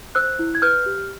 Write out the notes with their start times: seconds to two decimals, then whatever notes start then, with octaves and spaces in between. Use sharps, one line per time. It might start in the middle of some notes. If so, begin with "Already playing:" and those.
0.15 C5 E6 F#6
0.39 E4
0.55 G#6
0.62 B4 F6 G6
0.86 G4